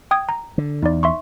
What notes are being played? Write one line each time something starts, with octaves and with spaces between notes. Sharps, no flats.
G5 D#6 G#6
A#5
D3
E2 D#4 D5
E5 C6 C#6